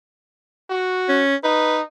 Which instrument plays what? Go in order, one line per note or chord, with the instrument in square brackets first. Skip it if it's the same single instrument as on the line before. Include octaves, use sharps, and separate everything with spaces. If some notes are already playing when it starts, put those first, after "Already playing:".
[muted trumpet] F#4
[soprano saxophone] C#4
[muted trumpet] D#4 [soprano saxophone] B4